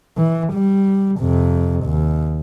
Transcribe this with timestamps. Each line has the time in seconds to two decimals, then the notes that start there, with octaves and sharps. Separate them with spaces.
0.17 E3
0.53 G3
1.19 F2 C3
1.85 D#2